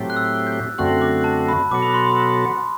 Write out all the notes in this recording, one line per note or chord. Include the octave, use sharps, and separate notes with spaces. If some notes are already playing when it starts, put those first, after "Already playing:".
Already playing: A2 F#3 A3 C4 G4
F#6
E6
G6
F#2 D3 A3 C4 F#4 F#6
D6
A5
B5
B2 F#3 B3 F#4 A4 D6
B5
C6